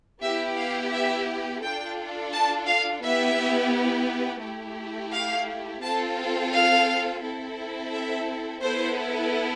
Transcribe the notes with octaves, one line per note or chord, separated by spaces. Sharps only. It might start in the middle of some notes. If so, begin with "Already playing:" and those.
B3 E4 G4 E5
F5
E5
D4 F4 A4 G5
A5
F5
B3 E4 G4 E5
A3 E4 G4
F5
C4 F4 A4 A5
F5
C4 E4 A4
E5
B3 E4 A4 C5